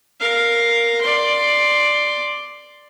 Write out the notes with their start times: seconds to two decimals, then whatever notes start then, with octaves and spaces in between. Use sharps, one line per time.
0.20 A#4 F5
1.01 D5 C6